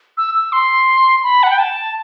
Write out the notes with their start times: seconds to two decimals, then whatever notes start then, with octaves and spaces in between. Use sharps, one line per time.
0.17 E6
0.35 E6
0.52 C6
1.23 B5
1.43 F#5
1.50 G5
1.59 A5